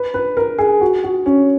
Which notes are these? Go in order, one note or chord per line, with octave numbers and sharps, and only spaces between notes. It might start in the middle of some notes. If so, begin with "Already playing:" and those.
Already playing: B4
B4
A#4
G#4
F#4
F#4
C#4